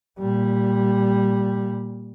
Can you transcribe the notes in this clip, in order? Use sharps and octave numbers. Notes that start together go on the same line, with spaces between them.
A#2 G3